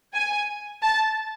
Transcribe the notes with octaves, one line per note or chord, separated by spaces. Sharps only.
G#5
A5